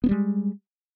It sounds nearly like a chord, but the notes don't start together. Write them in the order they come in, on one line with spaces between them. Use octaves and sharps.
B3 C#4 G3 G#3